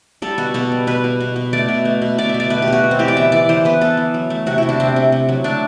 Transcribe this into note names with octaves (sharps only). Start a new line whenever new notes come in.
G3 A4
B2 F#4
B2 A4
G3
B2 B4
B2
B2
B2
A3 D5
B2
A3
B2
B2 D5
E5
B2
D5
A3 B4
G4
B2 F#4
B3
C4
E3 G4
D5
B3 E5
E3 D5
E3 C5
B3 B4
B3 A4
E3
F#3
A3
C3 F#4
C3 E4
D4
C3 C4
C3
C3
F#3
A3 D4